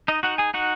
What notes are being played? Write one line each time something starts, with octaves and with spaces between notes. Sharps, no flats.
D#4 D#5
D#4 F#4 F#5
G#4 G#5
D#4 F#4 F#5